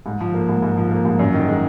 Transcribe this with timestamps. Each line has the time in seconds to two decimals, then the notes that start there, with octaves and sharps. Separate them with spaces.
0.06 G#2
0.21 F3
0.34 A#3
0.49 G#2
0.62 G#2
0.77 F3
0.91 A#3
1.05 G#2
1.19 F#2
1.34 D#3
1.48 G#3